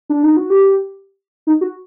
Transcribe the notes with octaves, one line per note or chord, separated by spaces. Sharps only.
D4
D#4
F#4
G4
D#4
F#4